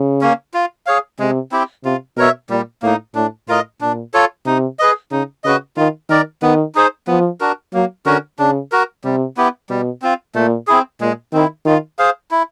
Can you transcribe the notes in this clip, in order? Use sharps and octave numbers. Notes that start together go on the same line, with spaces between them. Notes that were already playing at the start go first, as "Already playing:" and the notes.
Already playing: C#3
A#3 C#4
F4
G#4 C#5 F5
C3 G#3
C4 E4 G4
C3 F4
B2 A#4 C#5 E5
A#2 G3
A2 A#3 D#4
A2 D4
A2 F4 A#4 D#5
A#2 D4
F4 A4 C#5
C3 D#4
G#4 B4 D#5
C#3 D#4
C#3 F#4 B4 D#5
D#3 F4
D#3 A#4 D5
D#3 B3
D#4 G#4 C5
F3 B3
D4 F#4 A#4
F#3 A#3
D3 C#4 F#4 A#4
C#3 D4
F#4 A#4
C3 G3
B3 E4 G4
B2 G3
C4 F4
A#2 A3
C4 E4 G#4
A#2 G#3
D#3 C4 E4
D#3 F4
G#4 C5 F5
E4